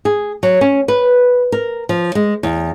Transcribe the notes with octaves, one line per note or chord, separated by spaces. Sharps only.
G#4
F#3
C#4
B4
A#4
F3
G#3
E2